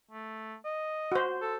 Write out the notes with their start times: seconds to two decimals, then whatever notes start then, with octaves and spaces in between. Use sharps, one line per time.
0.11 A3
0.65 D#5
1.12 F#4 C5
1.41 A4